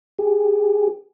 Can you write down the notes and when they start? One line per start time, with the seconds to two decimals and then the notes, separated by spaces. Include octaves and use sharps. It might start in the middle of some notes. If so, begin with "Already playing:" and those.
0.19 G4 G#4